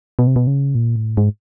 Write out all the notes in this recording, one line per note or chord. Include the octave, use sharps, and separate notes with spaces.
B2
C3
B2
C#3
A#2
A2
G#2